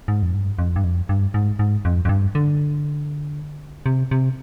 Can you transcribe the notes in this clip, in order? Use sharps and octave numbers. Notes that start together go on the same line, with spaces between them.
G#2
F2
G2
F2
G2
F2
G2
G#2
G#2
F2
F2
G2
D3
C3
C3